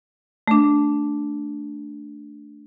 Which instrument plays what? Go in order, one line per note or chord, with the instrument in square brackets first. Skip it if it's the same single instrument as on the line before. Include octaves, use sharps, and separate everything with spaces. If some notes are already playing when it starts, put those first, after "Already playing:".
[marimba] A3 D4